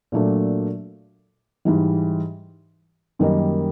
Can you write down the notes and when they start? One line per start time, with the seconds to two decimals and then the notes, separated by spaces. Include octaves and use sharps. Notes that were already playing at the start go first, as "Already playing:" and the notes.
0.12 A#2 F#3 A3 D4
1.65 G#2 E3 G3
3.19 F#2 D#3 G3 A#3 D#4